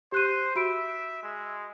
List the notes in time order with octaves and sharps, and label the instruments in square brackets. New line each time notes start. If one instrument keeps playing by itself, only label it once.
[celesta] G4 F#6 D#7 [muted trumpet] C5
[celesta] F#4 B5 D7 [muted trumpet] E5
[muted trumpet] G#3